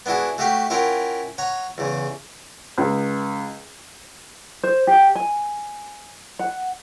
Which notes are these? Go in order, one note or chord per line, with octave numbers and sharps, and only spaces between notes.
B3 D4 E4 F#4 G#4
A3 F#4 G4 F5 G5
C#4 E4 F4 A#4 F#5 G5
C#5 F#5 A#5
E2 C#3
C#2
C5
G4
G#5
F#5